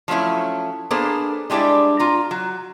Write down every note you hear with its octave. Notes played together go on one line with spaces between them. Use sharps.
F3 F#3 A3 C#4 E4
A#3 B3 D4 G#4 A4 C5
G3 G#3 D4 E4 D5
F4 A#5
F#3